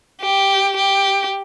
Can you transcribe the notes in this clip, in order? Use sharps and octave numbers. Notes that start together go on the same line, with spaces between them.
G4
G4